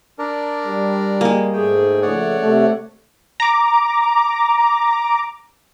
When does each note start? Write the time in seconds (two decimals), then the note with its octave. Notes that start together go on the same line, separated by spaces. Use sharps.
0.19 D4 A#4 D5
0.66 G3
1.21 G#3 A#3
1.53 G#2 A3 G#4 G5
2.02 C#3 F3 A3 C#5 D5 F#5
2.40 C3 A3
3.40 A#5 D6